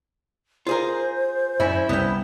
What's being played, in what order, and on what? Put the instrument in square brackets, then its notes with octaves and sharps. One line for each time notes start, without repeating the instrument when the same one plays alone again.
[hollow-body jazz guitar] F4 G#4 A#4 [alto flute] C5
[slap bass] F#2 [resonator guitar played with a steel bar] C#4 E4
[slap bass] C2 [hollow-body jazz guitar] B3 G5